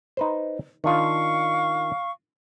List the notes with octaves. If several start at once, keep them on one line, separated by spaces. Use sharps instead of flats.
D#4 B4 C5
D#3 D4 F4 F5 C#6